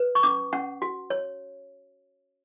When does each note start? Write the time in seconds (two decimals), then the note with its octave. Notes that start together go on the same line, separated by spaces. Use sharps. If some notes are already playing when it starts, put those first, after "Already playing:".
Already playing: B4
0.15 C#6
0.23 C#4 D6
0.53 C#4 F#5
0.82 F#4
1.10 C#5